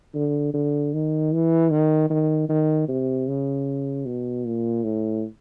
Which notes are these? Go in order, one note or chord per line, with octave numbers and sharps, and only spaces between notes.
D3
D3
D#3
E3
D#3
D#3
D#3
C3
C#3
B2
A#2
A2